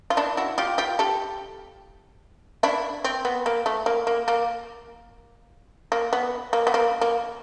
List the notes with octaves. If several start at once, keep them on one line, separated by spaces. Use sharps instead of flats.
F4
D4 E4
E4 F#4
F4 G4
F4 G4
G4 A4
D4 E4
C4
B3
A#3
A3
A#3
A#3
A#3
A#3
B3
A#3
B3
A#3
A#3